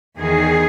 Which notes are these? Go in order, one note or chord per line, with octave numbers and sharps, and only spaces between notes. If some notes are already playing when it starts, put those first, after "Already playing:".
E2 D#3 G#4